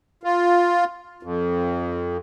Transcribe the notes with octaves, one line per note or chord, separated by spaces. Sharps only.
F4
F2